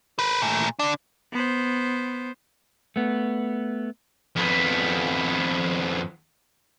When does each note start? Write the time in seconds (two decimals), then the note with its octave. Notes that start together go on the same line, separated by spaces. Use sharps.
0.19 A#4 B4
0.42 A#2 A3
0.79 D3 D4
1.33 B3 C5
2.96 A3 B3
4.36 F2 B3